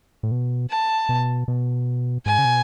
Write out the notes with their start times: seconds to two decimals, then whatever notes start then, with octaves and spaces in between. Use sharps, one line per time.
0.23 A2
0.31 B2
0.70 A5
1.09 B2
1.48 B2
2.26 G#2 G#5
2.38 C#3
2.45 B2